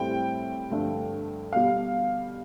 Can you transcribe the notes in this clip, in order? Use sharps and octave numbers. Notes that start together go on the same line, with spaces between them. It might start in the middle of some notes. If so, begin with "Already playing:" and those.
Already playing: A2 G3 C4 E4 G5
G2 D3 F3 A3
B2 G3 F5